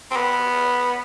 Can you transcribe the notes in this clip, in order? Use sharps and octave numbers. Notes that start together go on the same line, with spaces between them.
C4
B3